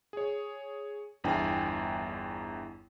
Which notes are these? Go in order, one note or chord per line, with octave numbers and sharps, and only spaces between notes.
G#4 C#5
G1 E2 D4 E4 G5 G#5